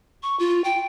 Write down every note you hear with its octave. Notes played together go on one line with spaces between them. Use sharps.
C#6
F4
G5